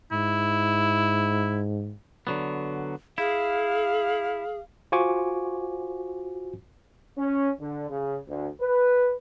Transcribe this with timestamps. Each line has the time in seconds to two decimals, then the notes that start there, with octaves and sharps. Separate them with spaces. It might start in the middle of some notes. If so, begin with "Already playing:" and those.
0.12 G#2 E4
2.27 D3 F#3 B3
3.18 E4 G#4 F5
4.92 F4 F#4 C5 G#5 C#6 D6
7.17 C#4
7.60 D3
7.90 C#3
8.28 D2
8.61 B4